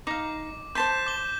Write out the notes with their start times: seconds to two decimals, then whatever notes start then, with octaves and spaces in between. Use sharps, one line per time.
0.07 D#4 F5 D6
0.75 C5 A5 C6 G6 B6 E7
1.06 D6 G7